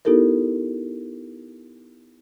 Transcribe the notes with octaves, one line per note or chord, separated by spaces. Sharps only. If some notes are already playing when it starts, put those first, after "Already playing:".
B3 D#4 E4 G4 A4 A#4